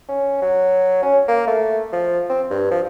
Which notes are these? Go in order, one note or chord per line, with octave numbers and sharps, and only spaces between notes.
C#4
F#3
C#4
A#3
A3
F3
C4
G2
F3